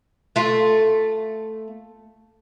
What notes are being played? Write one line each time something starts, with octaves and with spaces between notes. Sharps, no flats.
A3 F4